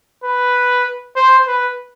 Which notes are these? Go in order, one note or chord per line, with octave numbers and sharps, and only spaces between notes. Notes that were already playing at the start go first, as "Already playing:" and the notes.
B4
C5
B4